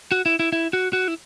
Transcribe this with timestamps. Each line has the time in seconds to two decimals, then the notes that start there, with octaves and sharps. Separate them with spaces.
0.12 F#4
0.26 E4
0.40 E4
0.53 E4
0.73 F#4
0.93 F#4
1.08 E4